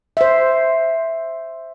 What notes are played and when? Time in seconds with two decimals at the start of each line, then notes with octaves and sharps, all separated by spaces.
0.17 C5 E5